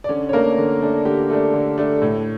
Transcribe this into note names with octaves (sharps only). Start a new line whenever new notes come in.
D5
D3 C#4 C#5
C#5
A3 A#3 D4 A#4
D3
A3 D4
D3 G4
A3 D4
D3
A3 D4
A2